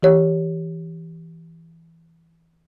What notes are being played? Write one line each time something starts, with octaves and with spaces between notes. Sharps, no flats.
E3 G4 C#5